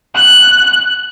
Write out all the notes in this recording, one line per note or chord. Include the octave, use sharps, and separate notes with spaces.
F#6